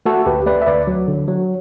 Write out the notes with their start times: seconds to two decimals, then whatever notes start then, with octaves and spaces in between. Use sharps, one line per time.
0.06 A3 F#4 A4
0.26 D2 G4 B4
0.46 A3 B4 D5
0.62 E5
0.66 D2 B4 D5
0.87 F#3
1.08 D3
1.28 F#3